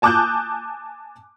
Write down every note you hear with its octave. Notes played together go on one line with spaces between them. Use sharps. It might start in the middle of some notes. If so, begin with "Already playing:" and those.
G#5 A5 D6 D#6 F#6 G6